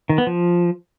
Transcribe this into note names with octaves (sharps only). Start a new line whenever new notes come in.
D#3
B3
F3